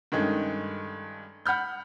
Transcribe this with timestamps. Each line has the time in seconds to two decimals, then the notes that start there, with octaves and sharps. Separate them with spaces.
0.12 G2 D#3 G#3 A3 C#4
1.46 F#5 B5 F6 G6